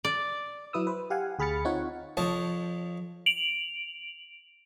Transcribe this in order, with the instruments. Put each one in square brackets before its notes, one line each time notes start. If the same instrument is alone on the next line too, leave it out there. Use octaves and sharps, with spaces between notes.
[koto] D5
[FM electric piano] F#3 E4 B4 D#6 E6
B4 C5
G4 F5 F#5 G#5
D2 G#4 B5 F6 A6 C#7
C4 D#4 F4 C#5 F#5
[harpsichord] F2 F3 C#5 D#5 A5
[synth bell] D7 F7 F#7